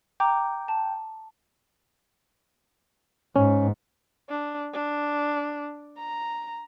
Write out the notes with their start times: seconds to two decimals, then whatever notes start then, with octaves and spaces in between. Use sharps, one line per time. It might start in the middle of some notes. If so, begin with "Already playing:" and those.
0.20 G5 A#5 D6
0.68 A5
3.36 G#2 C#4
4.29 D4
4.73 D4
5.98 A#5